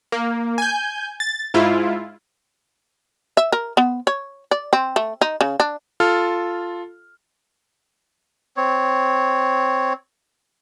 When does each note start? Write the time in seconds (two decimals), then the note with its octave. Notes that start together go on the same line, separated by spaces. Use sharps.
0.12 A#3
0.58 G#5 G6
1.20 A6
1.54 G#2 E4 F4
3.37 E5
3.52 A#4
3.77 B3
4.07 C#5
4.51 D5
4.73 C4
4.96 A3
5.21 D#4
5.41 C#3
5.60 D4
6.00 F4 A4 F6
8.57 C4 C#5